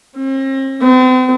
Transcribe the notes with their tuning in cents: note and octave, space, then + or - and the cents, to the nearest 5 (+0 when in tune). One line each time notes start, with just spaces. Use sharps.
C4 +45
C4 -40